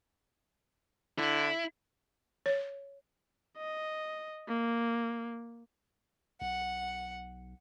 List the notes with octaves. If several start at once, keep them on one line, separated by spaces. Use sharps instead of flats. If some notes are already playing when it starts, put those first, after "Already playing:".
D3 E4
C#5
D#5
A#3
B1 F#5